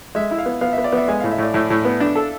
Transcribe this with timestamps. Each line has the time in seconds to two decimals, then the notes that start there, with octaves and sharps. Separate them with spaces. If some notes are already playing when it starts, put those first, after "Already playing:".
0.15 G#3 E5
0.31 E4
0.38 F5
0.46 B3
0.61 B3 F5
0.73 E5
0.78 B3
0.84 D5
0.92 B3 E5
1.08 G#3 G#5
1.20 F5
1.24 A2
1.31 E5
1.38 A2 D5
1.54 A2 E4
1.70 A2
1.85 B3
2.00 D4
2.15 A4